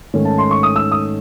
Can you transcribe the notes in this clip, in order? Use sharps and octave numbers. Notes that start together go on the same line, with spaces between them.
G#2 D#3 A3 C#4
A5
C6
C#6
D#6
E6
D#6